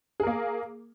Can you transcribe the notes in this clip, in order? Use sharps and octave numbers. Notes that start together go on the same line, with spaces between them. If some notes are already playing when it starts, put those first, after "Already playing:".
A#3 G#4 A#4